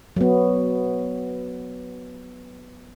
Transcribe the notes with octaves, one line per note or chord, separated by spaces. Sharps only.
F#3 B3